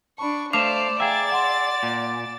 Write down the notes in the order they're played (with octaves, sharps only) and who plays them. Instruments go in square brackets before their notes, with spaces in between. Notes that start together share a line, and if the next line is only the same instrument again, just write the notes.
[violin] D4 C#6 [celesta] A5 B5
[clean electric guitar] A3 F5 [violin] C5 D5 [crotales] D6 E7
[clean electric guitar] G#4 E5 [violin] D5 A6 [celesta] F5 G5 A#5
[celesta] F#5 C6
[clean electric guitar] A#2